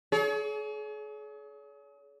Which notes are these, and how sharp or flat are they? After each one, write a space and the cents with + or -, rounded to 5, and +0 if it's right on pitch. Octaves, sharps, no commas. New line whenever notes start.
G#4 +40 C#5 +40